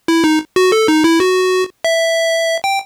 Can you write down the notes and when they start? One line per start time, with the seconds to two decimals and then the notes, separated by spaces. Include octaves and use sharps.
0.08 E4
0.24 D#4
0.56 F#4
0.72 A4
0.88 D#4
1.04 E4
1.20 F#4
1.84 E5
2.64 G5